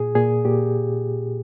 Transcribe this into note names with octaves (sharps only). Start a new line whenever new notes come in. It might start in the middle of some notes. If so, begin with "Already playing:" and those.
Already playing: A#2 G#4
A#2 G#4
A#2 G4